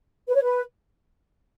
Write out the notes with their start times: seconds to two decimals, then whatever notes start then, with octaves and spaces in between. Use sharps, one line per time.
0.28 B4
0.35 C#5
0.43 B4